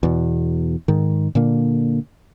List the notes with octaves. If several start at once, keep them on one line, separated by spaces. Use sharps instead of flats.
E2 B2
G#2 D#3
A#2 D3 A#3